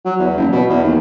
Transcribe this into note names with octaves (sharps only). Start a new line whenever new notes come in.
F#3
E2
F#1
B2
E2
D#2